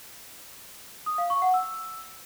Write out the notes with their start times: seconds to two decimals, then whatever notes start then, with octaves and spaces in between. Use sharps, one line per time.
1.06 D#6
1.18 F5
1.30 C#6
1.42 F#5
1.54 E6